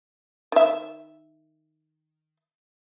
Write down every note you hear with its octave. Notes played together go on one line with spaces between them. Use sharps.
D#3 E5